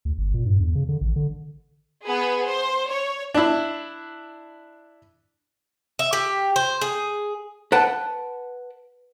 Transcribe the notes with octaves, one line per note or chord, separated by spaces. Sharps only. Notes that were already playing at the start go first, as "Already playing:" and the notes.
D2
G1
A#2
G2
E2
C#3
D3
A1
D3
B3 G#4 B4
C5
C#5
D4 E4
E5
G4
C5
G#4
B4 F#5 G5 A5